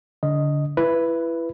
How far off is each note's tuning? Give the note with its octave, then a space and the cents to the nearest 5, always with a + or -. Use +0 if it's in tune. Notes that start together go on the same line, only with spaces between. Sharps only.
D3 -25 D#5 +0
E4 +25 B4 +0